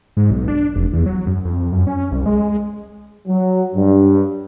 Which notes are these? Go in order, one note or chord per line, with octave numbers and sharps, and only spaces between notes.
G#2
B1
D4
F1
E2
F#3
F#2
F2
F#2
C#4
C2
G#3
F#3
G2